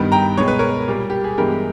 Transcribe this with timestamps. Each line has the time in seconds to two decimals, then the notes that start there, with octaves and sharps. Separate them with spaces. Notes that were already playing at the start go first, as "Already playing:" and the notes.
Already playing: G2 D#3 G3 B3
0.12 G5 A#5
0.37 B2 G#3 B3 C#5
0.48 B4
0.59 A#4 C#5
0.88 A#2 G3 A#3
1.10 G4
1.24 G#4
1.37 G2 E3 G#3 B3 G4 A#4